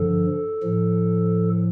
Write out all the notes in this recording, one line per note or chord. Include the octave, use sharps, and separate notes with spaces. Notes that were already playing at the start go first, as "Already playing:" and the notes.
Already playing: G2 D3 F3 A4
A2 F3